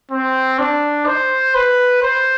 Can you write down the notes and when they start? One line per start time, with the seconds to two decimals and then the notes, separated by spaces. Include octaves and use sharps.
0.11 C4
0.59 D4
1.07 C5
1.55 B4
2.02 C5